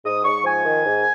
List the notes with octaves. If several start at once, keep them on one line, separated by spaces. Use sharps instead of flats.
G#2 D#6
G#2 C#6
F3 G#5
D#3
G#2